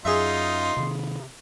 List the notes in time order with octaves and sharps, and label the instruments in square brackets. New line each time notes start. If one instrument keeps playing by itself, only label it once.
[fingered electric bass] F#2 [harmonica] D#4 F4 [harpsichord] G#4 E5 [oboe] C6
[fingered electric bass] C3 D#3